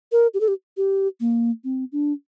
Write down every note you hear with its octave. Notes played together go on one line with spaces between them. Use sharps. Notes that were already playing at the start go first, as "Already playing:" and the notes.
A#4
G4
A4
G4
G4
A#3
C4
D4